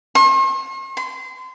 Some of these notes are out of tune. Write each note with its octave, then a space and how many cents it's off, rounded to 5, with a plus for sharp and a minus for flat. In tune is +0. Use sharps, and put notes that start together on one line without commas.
C6 +45
C6 -30